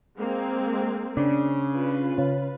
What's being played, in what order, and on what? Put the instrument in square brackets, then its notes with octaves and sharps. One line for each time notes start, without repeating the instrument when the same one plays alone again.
[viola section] G#3 A#3 C4
[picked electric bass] C#3 [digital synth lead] D4
[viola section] F4 B4
[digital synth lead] C#3